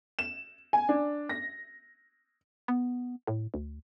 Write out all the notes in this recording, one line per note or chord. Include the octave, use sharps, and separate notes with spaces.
E7
G#5
D4
A#6
B3
A2
D2